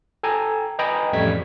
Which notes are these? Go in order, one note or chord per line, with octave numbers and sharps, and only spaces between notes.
A4 G5 G#5 A#5
B4 D#5 G5 G#5 A#5 B5
A1 F2 G3 A3 G#6 B6